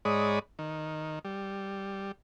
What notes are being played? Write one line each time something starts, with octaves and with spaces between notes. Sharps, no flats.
G#2 G#3 C#5 D5 B5 D#6
D#3
G3